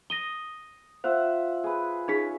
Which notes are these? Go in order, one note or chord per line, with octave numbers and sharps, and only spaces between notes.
D#6 A#6 D#7 G7
F4 C5 E5 F#5
G#4 B4
C#4 D#4 G#4 B6